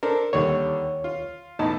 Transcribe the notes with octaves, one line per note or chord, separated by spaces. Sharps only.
D4 A4 A#4 C5
D#2 D3 D#3 G3 C#5
F4
E2 A2 D#4 A5